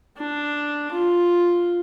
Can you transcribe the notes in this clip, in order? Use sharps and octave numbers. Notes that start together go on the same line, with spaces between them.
D4
F4